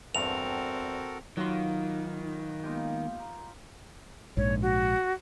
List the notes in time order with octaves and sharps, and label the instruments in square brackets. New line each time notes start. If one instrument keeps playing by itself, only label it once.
[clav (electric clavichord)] E2 G2 [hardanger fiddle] C4 [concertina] F#4 A4 A#4 [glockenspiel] F7
[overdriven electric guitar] D#3 [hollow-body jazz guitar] F#3 C6 [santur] A#3 B3 F#4 [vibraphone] D#4 F4
[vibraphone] G#3 A#3 B3 [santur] D#4 F4 G4
[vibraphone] A#5
[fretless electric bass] A#1 G#2 [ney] C#5
[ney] F#4